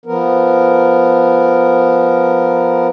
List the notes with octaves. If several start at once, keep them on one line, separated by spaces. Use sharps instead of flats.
F3 B3 A#4